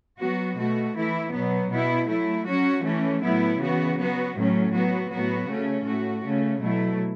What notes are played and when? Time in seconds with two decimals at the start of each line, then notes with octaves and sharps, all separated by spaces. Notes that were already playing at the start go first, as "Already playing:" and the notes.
0.19 F#3 B3 F#4
0.58 B2 A3 F#4
0.95 E3 A3 E4
1.32 B2 F#3 B3
1.70 B2 B3 E4
2.08 F#3 A3 E4
2.46 F#3 C#4 F#4
2.83 E3 A3 C#4
3.22 A2 F#3 B3 E4
3.59 C#3 E3 B3 F#4
3.97 F#3 B3 F#4
4.35 A2 F#3 A3 C#4
4.72 F#3 B3 F#4
5.10 A2 F#3 B3 F#4
5.49 C#3 A3 C#4
5.85 A2 A3 F#4
6.23 C#3 A3 C#4
6.61 B2 F#3 A3 E4